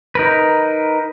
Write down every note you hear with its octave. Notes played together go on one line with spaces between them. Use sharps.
D#4 A#4 B4